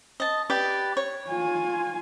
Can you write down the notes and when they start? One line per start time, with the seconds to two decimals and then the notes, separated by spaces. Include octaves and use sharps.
0.20 D#5 A5
0.50 G4 B4 D5
0.97 C#5
1.29 F4 G#5